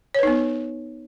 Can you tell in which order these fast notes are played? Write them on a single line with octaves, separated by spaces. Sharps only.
C#5 B4 D#4 B3